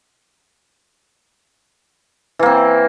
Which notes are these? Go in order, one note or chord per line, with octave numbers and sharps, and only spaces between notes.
E3 A#3 C4